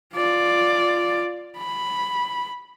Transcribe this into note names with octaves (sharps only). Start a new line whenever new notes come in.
F4 D5
B5